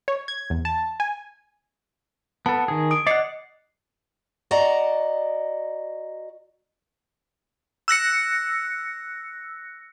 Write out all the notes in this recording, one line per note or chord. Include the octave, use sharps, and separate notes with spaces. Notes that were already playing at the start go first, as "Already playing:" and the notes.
C#5
G#6
E2
A5
G#5
B3 A4 A5
D#3 G#4
D#6 D7
D5 D#5 F#5 C7 C#7
F#4 D5 D#5 A#5
E6 F#6 A#6 C#7